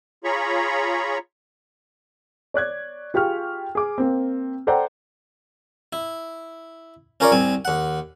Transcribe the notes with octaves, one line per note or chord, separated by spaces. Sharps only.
F4 G#4 C#5 A#5 B5 C#6
C#5 D5 F#6 G#6
F4 G4 G#4 C#6 F6
G#4 D6
A#3 C4
A4 C5 D5 F#5 G5 A#5
E4
C#4 F4 A#4 C#5 D5
C2 C4 G#5
D#2 F#5